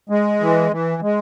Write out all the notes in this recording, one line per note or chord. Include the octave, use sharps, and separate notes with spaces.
G#3
E3
E3
G#3